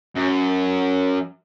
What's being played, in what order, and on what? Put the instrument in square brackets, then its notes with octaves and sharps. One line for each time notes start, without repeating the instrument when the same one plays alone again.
[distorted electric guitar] F#2